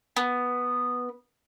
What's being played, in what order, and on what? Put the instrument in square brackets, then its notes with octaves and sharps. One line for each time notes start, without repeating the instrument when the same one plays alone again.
[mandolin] B3